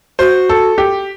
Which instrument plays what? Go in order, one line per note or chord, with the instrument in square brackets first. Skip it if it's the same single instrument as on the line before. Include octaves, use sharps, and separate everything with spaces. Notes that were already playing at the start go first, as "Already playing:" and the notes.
[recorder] F#4 [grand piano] C5
[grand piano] A4
G4